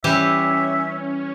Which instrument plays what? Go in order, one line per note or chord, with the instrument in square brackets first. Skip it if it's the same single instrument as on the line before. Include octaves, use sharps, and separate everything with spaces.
[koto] E3 G3 G4 [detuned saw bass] C#4 [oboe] E5